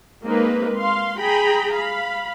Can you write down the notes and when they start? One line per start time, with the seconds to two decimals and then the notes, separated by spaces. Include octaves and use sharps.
0.24 G#3 A#3 C4 D#4 B4
0.77 F5 C6
1.18 G#4 G5 A#5 B5
1.74 F5 B5